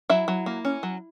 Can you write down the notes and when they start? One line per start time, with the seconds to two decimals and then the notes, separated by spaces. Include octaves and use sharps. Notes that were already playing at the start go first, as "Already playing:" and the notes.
0.10 F#3 E4 E5
0.28 F#3
0.46 A#3
0.65 C#4
0.83 F#3